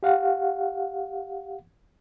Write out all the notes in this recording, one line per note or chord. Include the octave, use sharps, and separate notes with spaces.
G4 F5 F#5